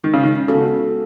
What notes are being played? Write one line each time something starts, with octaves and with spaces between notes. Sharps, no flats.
D#3 G#3
C#3
D#3
C#3 B3 F#4 A4